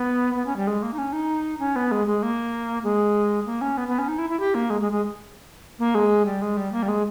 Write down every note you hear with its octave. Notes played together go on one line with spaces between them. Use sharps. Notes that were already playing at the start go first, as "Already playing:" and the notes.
Already playing: B3
B3
C#4
G3
G#3
A#3
D#4
C#4
D#4
C#4
B3
G#3
G#3
A#3
G#3
A#3
C#4
B3
B3
C#4
D#4
E4
E4
G4
A#3
G#3
G#3
G#3
A#3
G#3
G3
G#3
G3
A#3
G3
G#3